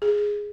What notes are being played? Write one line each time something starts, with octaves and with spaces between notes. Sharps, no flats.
G#4